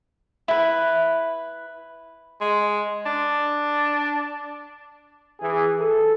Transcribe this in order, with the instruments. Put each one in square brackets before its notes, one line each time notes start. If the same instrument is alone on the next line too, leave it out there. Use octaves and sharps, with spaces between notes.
[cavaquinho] E4 B4
[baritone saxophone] G#3
D4
[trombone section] E3 G#4
A4